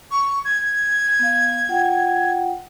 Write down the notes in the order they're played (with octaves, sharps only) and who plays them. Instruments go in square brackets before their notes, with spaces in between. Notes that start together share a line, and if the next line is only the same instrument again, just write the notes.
[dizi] C#6
G#6
[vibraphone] B3 F5
F4 F#5 G5